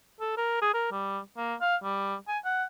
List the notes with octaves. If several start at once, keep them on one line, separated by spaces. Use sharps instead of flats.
A4
A#4
G#4
A#4
G3
A#3
F5
G3
G#5
F#5